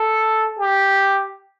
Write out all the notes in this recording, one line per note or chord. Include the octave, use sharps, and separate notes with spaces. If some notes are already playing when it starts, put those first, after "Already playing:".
Already playing: A4
G4